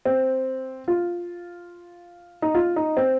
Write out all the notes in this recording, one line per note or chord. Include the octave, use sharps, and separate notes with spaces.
C4
F4
D#4
F4
D#4
C4